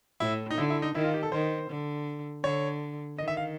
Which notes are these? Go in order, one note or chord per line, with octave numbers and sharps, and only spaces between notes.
A2 E4
D#4
D3 E4
E4
D#4
D#3 E4
F4
G4
A4
D#3 C5
D3
D3 C#5
D#3 D#5
E5
F5